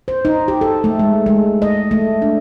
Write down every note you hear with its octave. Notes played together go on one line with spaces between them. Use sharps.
C5
D#4
G4
A4
A3
G#3
G#3
D#5
A3
D4